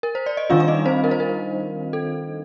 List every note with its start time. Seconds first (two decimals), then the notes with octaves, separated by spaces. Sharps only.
0.03 A#4
0.15 C5
0.26 D5
0.37 D#5
0.50 D#3 G3 D4 F4 F5
0.60 F5
0.68 D#4 D#5
0.86 C4 C5
1.04 A#4
1.11 C5
1.20 A#4
1.93 A4